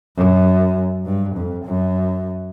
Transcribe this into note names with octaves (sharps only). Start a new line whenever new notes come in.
F#2
G2
F2
F#2